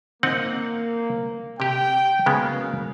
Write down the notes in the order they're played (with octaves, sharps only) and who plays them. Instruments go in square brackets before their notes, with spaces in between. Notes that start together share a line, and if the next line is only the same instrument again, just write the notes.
[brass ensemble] A#3 [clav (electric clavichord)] C4 D#4 F#5
[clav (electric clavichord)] C3 G4 [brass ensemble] G5
[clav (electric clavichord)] C#3 G#3 B3 [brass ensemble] F#3 A#3 F5